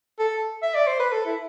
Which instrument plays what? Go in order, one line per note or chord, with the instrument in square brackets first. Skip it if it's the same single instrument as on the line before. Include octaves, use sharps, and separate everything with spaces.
[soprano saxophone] A4
E5
D5
C5
B4
A4
E4